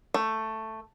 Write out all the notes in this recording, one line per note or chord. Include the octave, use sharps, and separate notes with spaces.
A3